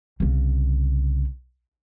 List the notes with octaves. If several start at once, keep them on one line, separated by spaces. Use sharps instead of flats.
C2 C#3